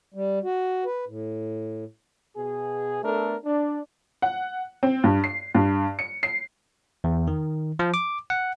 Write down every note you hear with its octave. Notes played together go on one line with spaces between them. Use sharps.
G3
F#4
B4
A2
B2 G#4
A3 B3 D4 A4 A#4
D4
F#5
C4
G2
C7
G2
C#7
C7
E2
D#3
F3
D6
F#5